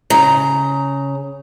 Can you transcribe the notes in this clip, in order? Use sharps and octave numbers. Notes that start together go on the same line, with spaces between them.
C#3 A#5